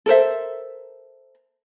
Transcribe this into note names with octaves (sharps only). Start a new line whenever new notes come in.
A4 A#4 C5 E5